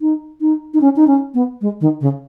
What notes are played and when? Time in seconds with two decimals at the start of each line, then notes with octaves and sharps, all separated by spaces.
0.01 D#4
0.41 D#4
0.74 D#4
0.81 C#4
0.96 D#4
1.07 C#4
1.34 B3
1.61 G#3
1.81 D#3
2.01 C#3